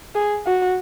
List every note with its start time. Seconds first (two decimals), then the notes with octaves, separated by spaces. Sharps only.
0.15 G#4
0.46 F#4